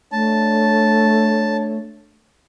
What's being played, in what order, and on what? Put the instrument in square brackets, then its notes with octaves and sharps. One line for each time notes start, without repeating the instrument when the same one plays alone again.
[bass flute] A3 [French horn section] D4 C#5 [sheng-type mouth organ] A5